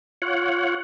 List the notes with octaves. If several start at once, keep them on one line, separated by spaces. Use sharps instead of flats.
F4 C#5 F#5